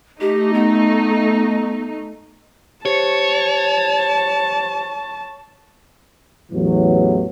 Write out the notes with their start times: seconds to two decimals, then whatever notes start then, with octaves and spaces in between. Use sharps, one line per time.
0.21 A3 D#4 G4
0.54 B3
2.85 G4 C5 C#5 A5 C#7
6.52 A1 E2 E3 F#3